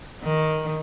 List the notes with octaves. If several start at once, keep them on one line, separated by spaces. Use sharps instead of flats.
D#3